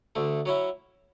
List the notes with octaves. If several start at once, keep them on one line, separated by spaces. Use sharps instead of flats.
D2 D3 A3
F#3 C#4 E4